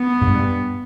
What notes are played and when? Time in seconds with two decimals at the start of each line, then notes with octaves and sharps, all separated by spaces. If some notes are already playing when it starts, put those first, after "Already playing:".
Already playing: B3
0.21 G#2
0.27 G2